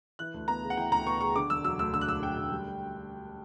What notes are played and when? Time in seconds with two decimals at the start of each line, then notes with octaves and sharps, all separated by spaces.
0.19 E3 F#6
0.34 D2
0.48 B3 A#5
0.63 C#3
0.70 F#5
0.77 E3 G5
0.92 D2 A#5
1.06 B3 C#6
1.21 C#3 C#6
1.36 D3 D6
1.50 E1 E6
1.64 F#3 E6
1.79 D2 E6
1.93 D3 E6
2.01 F#6
2.08 E1 E6
2.23 F#3 G5
2.37 D2
2.52 G3